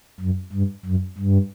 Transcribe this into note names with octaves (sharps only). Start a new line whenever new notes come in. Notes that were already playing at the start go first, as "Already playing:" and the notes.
F#2
G2
F#2
G2